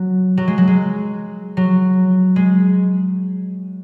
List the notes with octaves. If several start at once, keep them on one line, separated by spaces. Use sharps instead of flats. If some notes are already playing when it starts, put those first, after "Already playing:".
Already playing: F#3
F#3
G#3
F#3
G#3
F#3
G#3